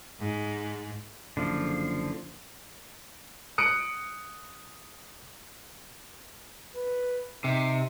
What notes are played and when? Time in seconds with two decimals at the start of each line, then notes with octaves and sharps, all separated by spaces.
0.20 G#2
1.37 F#1 D3 F3
3.58 D#6 F#6 C#7 D7
6.75 B4
7.44 C3 D#4